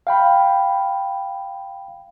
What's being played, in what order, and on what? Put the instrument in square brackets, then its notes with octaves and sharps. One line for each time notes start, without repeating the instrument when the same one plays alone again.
[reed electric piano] F5 G5 B5